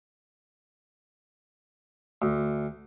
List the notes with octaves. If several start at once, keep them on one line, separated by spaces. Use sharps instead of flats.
D2